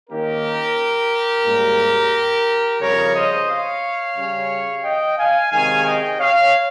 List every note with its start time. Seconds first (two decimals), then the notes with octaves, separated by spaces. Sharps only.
0.10 D#3 A#3 C#4 G4 A#4
1.46 G#2 G3 A#3 C#4
2.81 F2 C#3 G3 C#4 A#4 C#5
3.15 C5 D#5
3.49 C#5 F5
4.17 C#3 G3 C#4
4.84 D#5 G5
5.18 F5 G#5
5.52 C3 D#3 G#3 C#4 F5 G#5
5.86 D#5 G5
6.20 C#5 F5